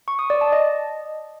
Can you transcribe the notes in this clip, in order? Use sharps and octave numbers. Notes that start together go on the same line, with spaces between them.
C#6
D#6
D5
A5
D#5